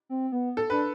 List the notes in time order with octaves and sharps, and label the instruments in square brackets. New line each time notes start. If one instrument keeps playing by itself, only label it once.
[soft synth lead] C4
B3
[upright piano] A4
[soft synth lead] D4 [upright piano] B4